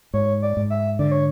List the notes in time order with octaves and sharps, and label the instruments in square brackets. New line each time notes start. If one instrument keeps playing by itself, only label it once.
[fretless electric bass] G#2 [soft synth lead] C#5
[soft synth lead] D5
[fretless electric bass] G#2
[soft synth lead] E5
[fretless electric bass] D3 [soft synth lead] D5
[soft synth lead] C#5